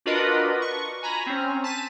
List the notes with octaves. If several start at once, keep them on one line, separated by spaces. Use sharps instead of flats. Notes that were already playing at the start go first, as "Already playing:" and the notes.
D4 F4 F#4 A#4 B4 D#5
C#6
G#5 A#5 B5
C4 C#4
A5 B6 D#7